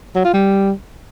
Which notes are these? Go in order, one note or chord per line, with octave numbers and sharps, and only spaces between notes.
F#3
F4
G3